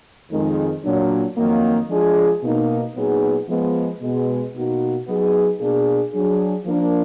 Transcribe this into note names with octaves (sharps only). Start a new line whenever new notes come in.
F2 D#3 G#3
A#2 F#3 D4
F2 D#3 F#3 A#3
F3 G#3 D4 F4 G#4
B2 A#3 D#4
A#2 F#3 B3 D#4 G#4
F3 G#3 B3
B2 G#3 B3
B2 A#3 D#4 F#4
F#3 B3 D#4 G#4
B2 A#3 D4 G#4
F#3 D4 G#4
F3 A#3 D4